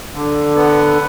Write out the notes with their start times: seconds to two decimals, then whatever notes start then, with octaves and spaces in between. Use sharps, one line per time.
0.14 D3
0.56 B3